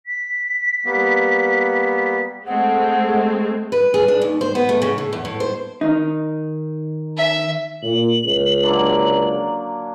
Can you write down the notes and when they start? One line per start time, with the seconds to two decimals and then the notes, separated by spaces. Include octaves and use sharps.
0.06 B6
0.85 G3 A#3 B3
2.46 G#3 A3 C4 F#5
3.72 B4
3.94 G#4
4.08 D4
4.22 D#2
4.41 C5
4.55 B3
4.69 A3
4.82 C#3
4.98 A2
5.13 E2
5.25 A2
5.40 C5
5.81 D#3 D#4
7.17 E5
7.83 A#2 F#7
8.24 C#2
8.63 D3 F#3 A#3